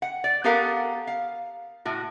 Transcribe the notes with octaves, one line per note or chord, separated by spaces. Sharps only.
F#5
D5
B3 G4 A4 A#4 F5 F#5
F5
A2 F#4